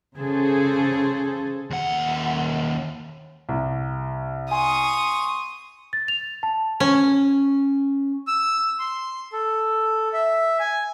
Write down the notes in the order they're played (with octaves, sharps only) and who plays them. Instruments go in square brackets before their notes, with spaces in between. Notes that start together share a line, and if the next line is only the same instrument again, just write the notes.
[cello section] C#3 G#4 A4 C5
[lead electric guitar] D#2 F#5
[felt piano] C2
[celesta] G#5 [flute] C6 [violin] C#6 D#6
[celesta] A6
F7
A5
[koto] C#4
[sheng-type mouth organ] E6
C6
A4
E5
G#5